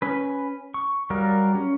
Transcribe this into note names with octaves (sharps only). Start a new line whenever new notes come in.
C#4 B4
C#6
F#3 G3 A#4 D5 F5
C#4